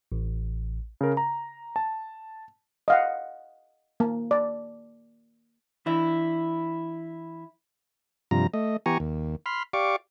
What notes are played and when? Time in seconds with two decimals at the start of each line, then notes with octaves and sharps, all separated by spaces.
0.12 A1
1.01 C#3 A#4
1.17 A#5
1.76 A5
2.88 D#5 F5 F#5
4.00 A#3
4.31 D5
5.86 E3 D4 E4
8.31 G2 C3 F3 A#5
8.54 A3 D#5
8.86 E3 B3 G4 G#5 A#5 C#6
9.00 D#2
9.46 B5 C6 F6
9.73 G4 D5 F5 C#6 D6